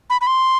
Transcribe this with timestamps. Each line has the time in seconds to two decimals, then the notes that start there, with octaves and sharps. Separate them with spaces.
0.10 B5
0.21 B5
0.27 C6